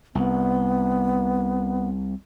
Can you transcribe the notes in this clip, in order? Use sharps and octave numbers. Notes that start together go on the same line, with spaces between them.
C2 B3